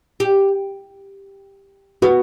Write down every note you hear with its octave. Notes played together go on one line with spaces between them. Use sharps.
G4
B3 F#4